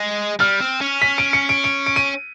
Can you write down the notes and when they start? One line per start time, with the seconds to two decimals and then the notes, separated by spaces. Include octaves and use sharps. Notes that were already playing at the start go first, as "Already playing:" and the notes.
Already playing: G#3
0.40 G3 F6
0.60 C4
0.81 C#4
1.02 B6
1.18 D7
1.33 C#7
1.49 D7
1.64 D7
1.86 D7
1.96 D#7